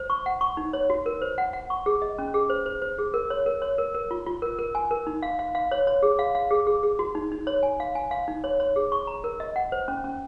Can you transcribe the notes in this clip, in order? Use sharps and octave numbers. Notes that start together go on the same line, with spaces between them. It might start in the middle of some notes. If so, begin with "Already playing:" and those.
Already playing: C5
C#6
F#5
C#6
D#4
C#5
F#4
A#4
C5
F#5
F#5
C#6
G#4
D#5
C#4
G#4
C5
C5
C5
G#4
A#4
C#5
A#4
C#5
A#4
A#4
F4
F4
A#4
A#4
G#5
A#4
D#4
F5
F5
F5
C#5
C#5
G#4
F5
F5
G#4
G#4
G#4
F#4
D#4
D#4
C#5
G#5
F5
G#5
F5
D#4
C#5
C#5
G#4
C#6
A#5
A#4
D#5
F#5
C5
C#4
C#4